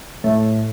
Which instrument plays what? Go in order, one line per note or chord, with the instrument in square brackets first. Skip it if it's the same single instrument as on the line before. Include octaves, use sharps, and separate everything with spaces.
[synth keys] A2